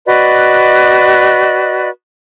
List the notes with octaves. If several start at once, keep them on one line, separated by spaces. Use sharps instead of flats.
F#4 B4 D5 D#5